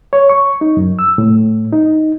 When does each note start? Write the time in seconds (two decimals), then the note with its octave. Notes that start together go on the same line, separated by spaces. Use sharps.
0.13 C#5
0.30 C#6
0.61 D#4
0.77 F#2
0.99 E6
1.18 A2
1.73 D#4